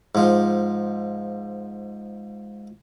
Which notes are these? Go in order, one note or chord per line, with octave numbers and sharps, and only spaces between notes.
G#2 F3